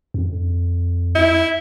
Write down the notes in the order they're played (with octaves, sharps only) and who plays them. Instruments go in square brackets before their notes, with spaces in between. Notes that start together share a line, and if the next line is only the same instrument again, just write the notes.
[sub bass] F2
[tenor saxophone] E4